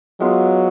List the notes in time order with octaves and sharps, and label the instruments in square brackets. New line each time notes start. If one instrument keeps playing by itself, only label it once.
[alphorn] F#3 [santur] G#3 B3 F4